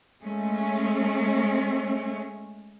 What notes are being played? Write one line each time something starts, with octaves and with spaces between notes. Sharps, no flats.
G#3 A3 C#4